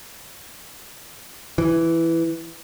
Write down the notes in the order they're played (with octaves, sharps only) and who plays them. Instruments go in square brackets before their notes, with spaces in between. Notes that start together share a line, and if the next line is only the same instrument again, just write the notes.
[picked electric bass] E3